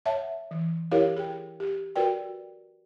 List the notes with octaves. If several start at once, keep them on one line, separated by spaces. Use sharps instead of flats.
C#5 E5 F#5 A5
E3
E4 G4 A#4 C#5 F5
G#4 G5
G4
F#4 A#4 B4 D5 G5